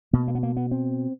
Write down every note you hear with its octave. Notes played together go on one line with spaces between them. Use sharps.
B2 A#3
A#3
B3
A#3
B3
C4